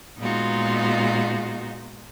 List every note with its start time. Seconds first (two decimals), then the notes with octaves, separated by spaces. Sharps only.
0.19 A#2 G#3 B3 D#4 F4 F#4